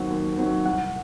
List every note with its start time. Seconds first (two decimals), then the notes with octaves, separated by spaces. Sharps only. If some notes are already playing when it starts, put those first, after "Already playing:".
Already playing: D#2 D#3 F#3 C4 F#5
0.10 D#2
0.38 D#3 F#3 C4
0.65 C2 F#5